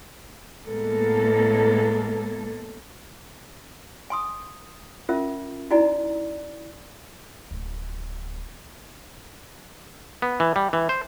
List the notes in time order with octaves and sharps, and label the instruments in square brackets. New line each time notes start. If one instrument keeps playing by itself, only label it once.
[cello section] A2 G#3 A#3 B3 A4
[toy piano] G#5 C6 D#6
C#4 F4 A#4 E5
D#4 E4 F#4 D5 G#5 A#5
[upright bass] D1
[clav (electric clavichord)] B3
E3
G3
E3
C5